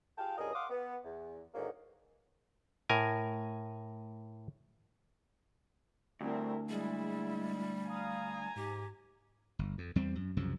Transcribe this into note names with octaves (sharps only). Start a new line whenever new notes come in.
F4 G4 G#4 F5 G5 A5
C#2 G2 F#3 G#4 A#4 D#5
F5 F#5 C6 D6 D#6
B3
E2
E2 G#2 D3 D#3 F#3 A#3
A2 A#4 G#5
D2 G3 A3 C4 E4 A#4
G3 G#3 E4
F5 G#5 A#5 D#6
G#2 G4
G1
F2
E2 G3 C4
F#2
C2 F#2 C#3 F3